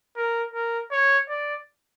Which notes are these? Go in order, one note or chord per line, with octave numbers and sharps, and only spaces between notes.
A#4
A#4
C#5
D5